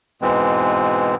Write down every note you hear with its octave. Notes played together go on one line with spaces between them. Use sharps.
G#2 B2 E3 G#3 C4